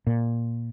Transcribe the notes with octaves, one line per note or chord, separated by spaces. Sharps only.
A#2